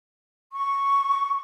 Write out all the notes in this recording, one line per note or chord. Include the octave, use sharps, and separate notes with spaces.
C#6